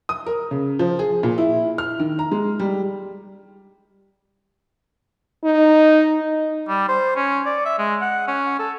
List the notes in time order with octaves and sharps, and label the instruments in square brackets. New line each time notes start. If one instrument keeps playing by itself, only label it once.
[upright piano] D#6
A#4
C#3
F3
G#4
A#2
E4
F6
D#3
A#5
G#3
G3
[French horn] D#4
[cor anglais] G3
C5
C#4
D5
E5
G#3
F#5
C#4
A4